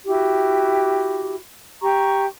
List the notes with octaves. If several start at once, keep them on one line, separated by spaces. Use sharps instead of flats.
E4 F#4 G4
G4 A#5 C#6